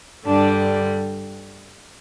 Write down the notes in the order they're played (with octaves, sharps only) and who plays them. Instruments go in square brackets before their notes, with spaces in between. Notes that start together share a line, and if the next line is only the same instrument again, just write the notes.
[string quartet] G2 D3 G3 D4